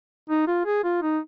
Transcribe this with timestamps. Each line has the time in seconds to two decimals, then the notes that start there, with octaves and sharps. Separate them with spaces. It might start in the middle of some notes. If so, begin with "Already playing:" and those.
0.30 D#4
0.47 F4
0.66 G#4
0.84 F4
1.02 D#4